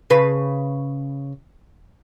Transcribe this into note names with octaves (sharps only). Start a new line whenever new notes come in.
C#3 B4